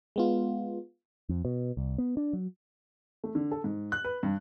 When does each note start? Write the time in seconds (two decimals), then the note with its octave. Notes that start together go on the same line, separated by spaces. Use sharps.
0.16 G#3 B3 F4
1.29 F2
1.45 B2
1.77 C2
1.98 B3
2.17 D4
2.33 F#3
3.24 A3
3.35 D3
3.51 A4
3.64 G#2
3.92 F#6
4.05 B4
4.23 G2